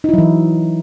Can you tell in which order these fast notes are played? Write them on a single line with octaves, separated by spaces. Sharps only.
D#4 E4 F#3 E3